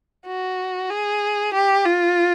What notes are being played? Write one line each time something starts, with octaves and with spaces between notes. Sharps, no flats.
F#4
G#4
G4
F4